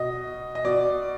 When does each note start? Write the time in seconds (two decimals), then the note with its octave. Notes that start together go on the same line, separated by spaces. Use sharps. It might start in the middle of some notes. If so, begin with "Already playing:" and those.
Already playing: B2 D#5
0.55 D#5
0.65 B2 D5